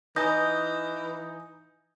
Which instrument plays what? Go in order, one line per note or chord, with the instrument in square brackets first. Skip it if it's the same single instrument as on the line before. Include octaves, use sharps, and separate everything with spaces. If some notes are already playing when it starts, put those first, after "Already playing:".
[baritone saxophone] E3 [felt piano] D#4 G#5 [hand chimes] D#6 G6 A#6